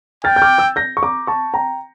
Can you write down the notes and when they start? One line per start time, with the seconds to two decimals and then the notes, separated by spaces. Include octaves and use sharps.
0.24 G5 F6 A6
0.36 G6
0.42 D6 F6
0.58 E6 G6
0.76 G6 A#6
0.97 C#6
1.03 A#5 D6
1.27 A5 C#6
1.54 G5 A#5